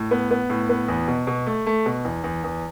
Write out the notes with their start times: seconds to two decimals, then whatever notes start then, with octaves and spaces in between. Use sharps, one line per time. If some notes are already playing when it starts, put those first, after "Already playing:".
Already playing: A2
0.11 B3
0.31 B3
0.50 A2
0.69 B3
0.88 E2
1.08 B2
1.27 B2
1.47 A3
1.66 A3
1.86 B2
2.05 E2
2.24 E2
2.44 E2